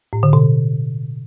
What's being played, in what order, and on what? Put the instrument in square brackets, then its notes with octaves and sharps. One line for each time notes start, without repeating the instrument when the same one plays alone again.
[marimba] A2
D3
B2